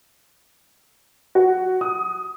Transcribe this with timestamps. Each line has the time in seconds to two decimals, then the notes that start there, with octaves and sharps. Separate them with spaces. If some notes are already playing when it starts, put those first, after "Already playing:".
1.35 F#4
1.81 D#6